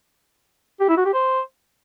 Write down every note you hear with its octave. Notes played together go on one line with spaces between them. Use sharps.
G4
E4
F#4
G4
C5